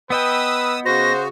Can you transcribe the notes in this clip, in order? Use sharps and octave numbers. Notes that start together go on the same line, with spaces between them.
B3 B4 D#5 G5 D#6 E6
C#3 F#4 C5 A#6